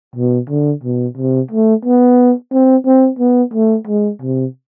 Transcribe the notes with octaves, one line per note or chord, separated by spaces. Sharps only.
B2
D3
B2
C3
A3
B3
C4
C4
B3
A3
G#3
C3